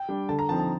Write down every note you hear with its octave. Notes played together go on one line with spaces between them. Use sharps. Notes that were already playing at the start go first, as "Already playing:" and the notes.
Already playing: G5
G3 D4
D3 A5
A#5
F3 C4 D#4 A5
A5